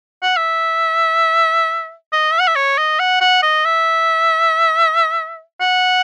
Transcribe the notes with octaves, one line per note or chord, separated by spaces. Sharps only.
F#5
E5
D#5
E5
F#5
E5
C#5
D#5
F#5
F#5
D#5
E5
F#5